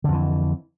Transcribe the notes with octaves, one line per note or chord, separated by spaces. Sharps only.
F2 D3 E3